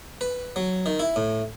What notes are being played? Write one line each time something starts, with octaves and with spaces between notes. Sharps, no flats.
B4
F#3
D#3
E4
A2